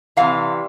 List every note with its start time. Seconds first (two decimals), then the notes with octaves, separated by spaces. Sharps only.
0.17 C3 E3 G3 F5